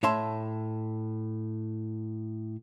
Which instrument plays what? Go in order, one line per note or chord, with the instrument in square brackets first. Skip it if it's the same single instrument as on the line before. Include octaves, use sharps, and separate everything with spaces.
[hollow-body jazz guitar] A2 C#5 E5 A5 C6